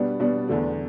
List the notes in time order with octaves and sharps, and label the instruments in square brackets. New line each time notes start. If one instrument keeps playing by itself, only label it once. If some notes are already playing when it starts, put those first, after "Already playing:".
Already playing: [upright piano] B2 G3 B3 D4
B2 G3 B3 D4
E2 D3 A3 D4